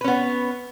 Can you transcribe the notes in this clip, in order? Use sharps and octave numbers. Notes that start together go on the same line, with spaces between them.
B3 C#4 B4